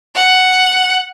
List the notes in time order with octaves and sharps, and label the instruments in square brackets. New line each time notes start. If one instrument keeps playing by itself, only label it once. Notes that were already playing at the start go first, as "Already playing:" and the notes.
[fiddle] F#5